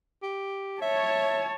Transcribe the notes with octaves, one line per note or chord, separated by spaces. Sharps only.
G4
C#5 E5 A5